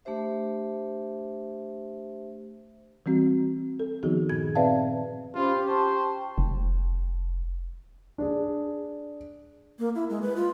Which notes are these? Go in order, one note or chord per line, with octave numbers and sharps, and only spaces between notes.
A3 D4 G4 C5 E5
E3 G3 C4 F#4
A4
D#3 F3 B3 D#4 F#4 G#4
G2 A#2 G#6
C4 B4 D5 E5 F5 A5
C#4 F4 G4 C5 B5
C5 G5 A5 C#6
F1
D4 G#4
A#3
E4
G#3
B4
F4